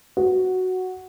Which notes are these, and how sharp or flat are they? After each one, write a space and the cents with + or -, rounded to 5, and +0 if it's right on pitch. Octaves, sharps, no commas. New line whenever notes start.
F#4 +0